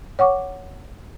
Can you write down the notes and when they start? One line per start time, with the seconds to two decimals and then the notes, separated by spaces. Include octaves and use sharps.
0.19 C#5 F#5 C#6 D6